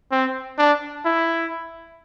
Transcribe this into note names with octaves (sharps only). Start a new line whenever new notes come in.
C4
D4
E4